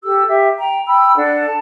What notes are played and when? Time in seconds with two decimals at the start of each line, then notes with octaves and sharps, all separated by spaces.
0.03 G4 A4 E6
0.26 G4 E5
0.57 G5 A#5
0.86 G5 B5 E6
1.15 D4 A4 F#5
1.44 A5